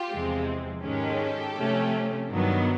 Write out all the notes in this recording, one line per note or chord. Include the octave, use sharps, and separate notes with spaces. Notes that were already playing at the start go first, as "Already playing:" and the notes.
Already playing: F4 G4
E2 C3 F3 G#3 C4
G#2 D#3 G#3 C#4 G4 A4
C3 F3 A3 C#4
G2 D#3 F#3 B3